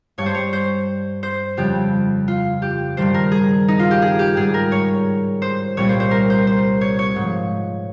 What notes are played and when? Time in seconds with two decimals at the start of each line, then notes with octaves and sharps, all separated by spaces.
0.18 G2 G3 C#5
0.26 C5
0.34 C#5
0.53 C5
1.23 C5
1.57 F2 C#3 G3 G4
2.28 F4
2.62 G4
2.97 G2 D#3 G3 C5
3.14 A#4
3.32 G#4
3.68 D#4
3.79 F4
3.91 G4
4.02 G#4
4.19 G4
4.37 G#2 G3 G#4
4.54 A#4
4.72 C#5
5.42 C5
5.77 C2 A#2 G3 C#5
5.89 C5
6.00 C5
6.11 A#4
6.30 C5
6.47 C5
6.81 C#5
6.99 C#5
7.16 G#2
7.21 F3